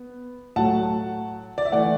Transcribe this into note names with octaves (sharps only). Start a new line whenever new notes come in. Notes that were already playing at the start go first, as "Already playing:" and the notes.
Already playing: B3
A2 F#3 A3 F#5 A5
D5
E5
E3 A3 D5 F#5